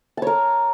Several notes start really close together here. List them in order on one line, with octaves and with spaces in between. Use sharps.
A5 C#5 A#4